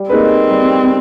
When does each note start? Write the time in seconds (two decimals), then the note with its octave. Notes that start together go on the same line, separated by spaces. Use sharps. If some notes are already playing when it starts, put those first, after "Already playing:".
Already playing: G3
0.09 A#3 C4 D#4 G#4 B4
0.50 G3